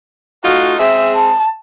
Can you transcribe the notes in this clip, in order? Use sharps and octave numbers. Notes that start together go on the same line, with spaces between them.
A3 D#4 F4 F#4
G#3 C4 G#4 E5
A5